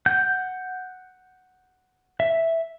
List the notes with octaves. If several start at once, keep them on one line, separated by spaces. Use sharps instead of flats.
F#5 G6
E5